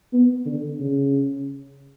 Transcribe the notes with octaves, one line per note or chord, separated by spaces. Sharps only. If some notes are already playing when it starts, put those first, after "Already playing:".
B3
D3
C#3